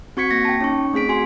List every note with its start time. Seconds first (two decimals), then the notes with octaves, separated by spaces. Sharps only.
0.17 C4 F#4 C#6 G#6 B6 C#7
0.31 A#3 A#6
0.45 G5 A5
0.61 C#4 D#4 C#6
0.93 A3 C4 G#4 B6 D7
1.09 F#4 G#5 C6